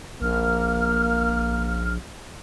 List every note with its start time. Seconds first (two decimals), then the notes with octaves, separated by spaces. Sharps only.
0.22 A#1 A#3 F6